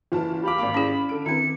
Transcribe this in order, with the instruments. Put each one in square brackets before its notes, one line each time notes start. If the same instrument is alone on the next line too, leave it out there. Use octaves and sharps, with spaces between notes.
[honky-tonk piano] F#1 F4 A5 [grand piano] E3
[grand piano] G4 F5 D6 [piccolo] B5
[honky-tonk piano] G#1 A#3 [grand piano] F5 D6
[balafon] C#4 E4 G#4
[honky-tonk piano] D3 A4 D7
[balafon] D#3 C4 [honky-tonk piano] E4 B4 [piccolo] C#7